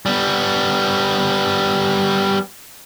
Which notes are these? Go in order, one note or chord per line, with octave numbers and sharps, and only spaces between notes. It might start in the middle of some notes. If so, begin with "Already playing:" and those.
G3 B3